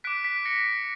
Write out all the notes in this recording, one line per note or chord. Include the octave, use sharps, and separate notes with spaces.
D6 F#6 B6 D7
B6
A#6 C#7